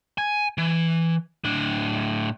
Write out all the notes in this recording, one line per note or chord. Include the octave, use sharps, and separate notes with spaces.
G#5
E3
A2 D4